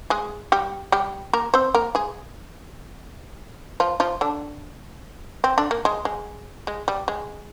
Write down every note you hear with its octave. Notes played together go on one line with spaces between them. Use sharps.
G#3 G#4
G3 G4
G3 G4
A#3 A#4
C4 C5
A#3 A#4
G#3 G#4
F3 F4
F3 F4
D3 D4
C4
D3 D4
A#3
G#3
G#3
G#3
G3
G#3